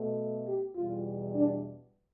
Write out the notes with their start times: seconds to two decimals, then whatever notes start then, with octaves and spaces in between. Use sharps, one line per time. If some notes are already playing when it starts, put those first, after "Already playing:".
Already playing: B2 A3
0.47 G4
0.75 E2 B2 G3 F4
1.35 D4